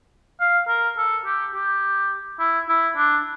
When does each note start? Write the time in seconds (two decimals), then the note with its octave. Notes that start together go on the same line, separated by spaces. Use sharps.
0.41 F5
0.68 A#4
0.97 A4
1.26 G4
1.55 G4
2.39 E4
2.69 E4
2.97 D4